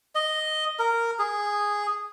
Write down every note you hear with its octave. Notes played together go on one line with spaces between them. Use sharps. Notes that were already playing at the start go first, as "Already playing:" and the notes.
D#5
A#4
G#4